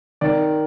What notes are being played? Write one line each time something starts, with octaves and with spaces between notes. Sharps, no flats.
D#3 D5